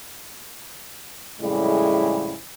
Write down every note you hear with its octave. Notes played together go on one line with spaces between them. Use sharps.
F2 A2 C#3 G3 G#3 E4